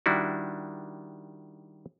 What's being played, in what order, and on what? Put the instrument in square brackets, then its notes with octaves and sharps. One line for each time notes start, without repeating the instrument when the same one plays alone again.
[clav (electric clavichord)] D#3 G3 D4 E4 F#4